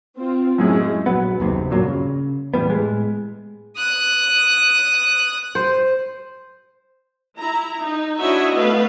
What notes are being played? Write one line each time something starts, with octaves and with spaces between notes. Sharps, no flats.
C4 F4
F#2 A2 G#3 C#4 G#4
A#1 F#3 B3
F#1 D#2 C3
G2 A#2 F#3 A#3
C#3
A2 E3 G3 B3
A2 G#3
D#6 F#6
C5
E4 A#5
D#4
D4 E4 F#4 C#5 D#5 E5
A3 B3 B4 F5